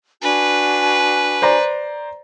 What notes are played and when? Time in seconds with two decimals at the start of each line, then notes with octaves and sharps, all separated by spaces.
0.22 D4 F#4 B4 G#5
1.42 C5 D5 A#5